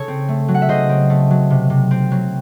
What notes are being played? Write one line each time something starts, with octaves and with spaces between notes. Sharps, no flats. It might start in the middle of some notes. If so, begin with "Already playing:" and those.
Already playing: C#3 A4 C#5
C4
A3
F#3
F#5
E5
C#3 C5 D#5
C4
A3
F#3
C3
C3
C4
F#3